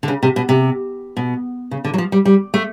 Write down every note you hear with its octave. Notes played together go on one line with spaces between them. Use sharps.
D3
C#3
C3
B2
C3
B2
C#3
D3
F#3
F3
G3
G3
A3